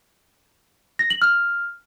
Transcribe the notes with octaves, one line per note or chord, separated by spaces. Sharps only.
A#6
F#7
F6